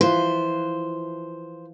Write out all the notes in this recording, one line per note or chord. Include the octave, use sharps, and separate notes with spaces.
E3 F3 B4 C5